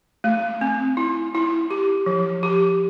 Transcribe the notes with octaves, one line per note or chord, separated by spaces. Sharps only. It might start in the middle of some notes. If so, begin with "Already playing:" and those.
A3
C4
E4
E4
G4
F3
G4